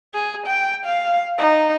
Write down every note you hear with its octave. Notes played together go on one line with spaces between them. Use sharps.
G#4
G5
F5
D#4